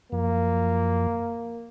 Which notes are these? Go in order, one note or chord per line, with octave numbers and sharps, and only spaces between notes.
F#2 F3 A#3